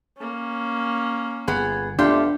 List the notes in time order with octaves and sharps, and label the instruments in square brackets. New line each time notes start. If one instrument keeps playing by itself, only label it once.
[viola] A#3 C#4
[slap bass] G1 [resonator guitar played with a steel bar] B3 G#4
[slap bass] E1 B3 [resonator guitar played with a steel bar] A3 F4 G4 [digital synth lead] D4